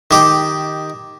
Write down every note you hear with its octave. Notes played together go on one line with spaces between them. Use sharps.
D#3 G4